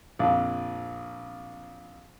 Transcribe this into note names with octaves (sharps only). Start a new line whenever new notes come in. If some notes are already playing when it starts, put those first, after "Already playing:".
A#1 F2